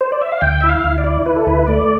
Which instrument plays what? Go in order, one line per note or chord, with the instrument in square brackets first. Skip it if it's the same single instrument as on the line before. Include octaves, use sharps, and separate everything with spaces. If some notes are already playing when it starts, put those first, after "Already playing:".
[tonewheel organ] C5
D5
E5
F5
D2 G5
E4 E5
F5
D2
D5
E4
E4 B4
A4
D2 B4
A3 D5